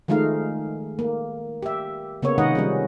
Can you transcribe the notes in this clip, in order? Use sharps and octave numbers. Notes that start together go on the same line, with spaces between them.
D#3 F3 G#3 A3 D#4 F5
A#3
G4 E5
C#3 A#3 B3 C#5
C3 D#3 G#3 D#4 D#5 F#5
F3 G3 C#4